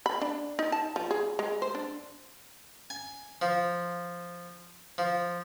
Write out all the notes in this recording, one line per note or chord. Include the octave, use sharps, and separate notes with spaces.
B5
D4
D#4
A5
F3
G#4
G#3
C5
D4
G#5
F3
F3